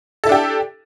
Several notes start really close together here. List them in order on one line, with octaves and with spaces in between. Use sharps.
A4 E4 D4 G4